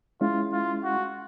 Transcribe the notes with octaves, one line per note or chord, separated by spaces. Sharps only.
G#3 C#4 E4 F4
F4
F#4